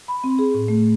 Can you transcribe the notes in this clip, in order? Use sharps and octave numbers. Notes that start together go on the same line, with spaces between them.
B5
C4
G#4
A2
A3